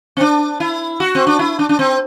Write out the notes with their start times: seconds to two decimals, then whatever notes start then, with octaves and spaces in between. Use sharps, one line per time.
0.17 C4
0.21 D4
0.60 E4
1.00 F#4
1.15 C4
1.27 D4
1.39 E4
1.59 D4
1.69 D4
1.79 C4